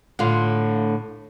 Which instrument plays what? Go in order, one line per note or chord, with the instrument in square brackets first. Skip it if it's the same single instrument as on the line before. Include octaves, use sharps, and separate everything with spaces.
[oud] A2 D3 F4